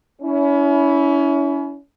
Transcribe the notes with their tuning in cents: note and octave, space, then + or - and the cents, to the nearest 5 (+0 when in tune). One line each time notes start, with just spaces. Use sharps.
C#4 +30 E4 -10